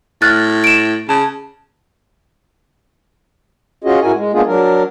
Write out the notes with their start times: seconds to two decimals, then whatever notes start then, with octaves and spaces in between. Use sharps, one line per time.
0.22 A2 F6 F#6 A6
0.64 D7 E7
1.09 C#3 A5
3.84 C#4 F4 F#4 G#4 D#5
4.02 A2 E4 F#4 A#4 G#5
4.15 G#3
4.33 G#3 A#3 B3 D4 F4 G#4
4.47 F#3 D4 A#4